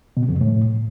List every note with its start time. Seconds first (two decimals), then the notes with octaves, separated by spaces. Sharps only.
0.17 B2
0.23 C3
0.29 F2
0.35 G2
0.41 A2